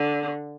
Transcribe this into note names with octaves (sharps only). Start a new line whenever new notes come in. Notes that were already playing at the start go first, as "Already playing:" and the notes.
Already playing: D3